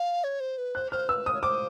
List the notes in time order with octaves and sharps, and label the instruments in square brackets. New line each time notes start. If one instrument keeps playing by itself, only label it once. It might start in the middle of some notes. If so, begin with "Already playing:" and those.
Already playing: [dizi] F5
C#5
C5
B4
[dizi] C5 [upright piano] F#6
[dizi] C5 [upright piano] F6
[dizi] B4 [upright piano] E6
[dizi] C5 [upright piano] D#6
[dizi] C#5
[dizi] C5 [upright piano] D6